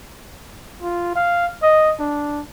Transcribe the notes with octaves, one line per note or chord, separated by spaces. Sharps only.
F4
F5
D#5
D4